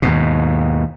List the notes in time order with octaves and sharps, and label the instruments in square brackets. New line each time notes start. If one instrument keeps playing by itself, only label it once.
[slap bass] D#2 G#2 B2